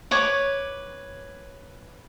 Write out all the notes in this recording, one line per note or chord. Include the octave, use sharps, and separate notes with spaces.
B4 C#5 D6